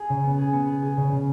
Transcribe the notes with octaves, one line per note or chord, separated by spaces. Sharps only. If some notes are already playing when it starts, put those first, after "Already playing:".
Already playing: G#4
C#3
B3
G#4
B3
G#4
G#4
C#3
C#3